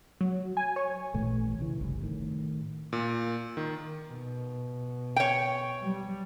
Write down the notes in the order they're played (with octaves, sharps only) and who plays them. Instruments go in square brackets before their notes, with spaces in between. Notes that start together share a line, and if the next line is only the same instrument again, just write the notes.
[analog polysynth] F#3
G#5
C#5
[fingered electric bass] A1 A#2 E3 A3
B1 C#3 E3
F#1 C2
A2 D#3
[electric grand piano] A#2
D#3
[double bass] B2
[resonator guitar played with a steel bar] C#5 G5
[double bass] G3